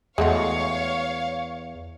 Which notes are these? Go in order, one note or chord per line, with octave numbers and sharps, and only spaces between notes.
E2 G#3 A3 F#4 C#5 F5 C#6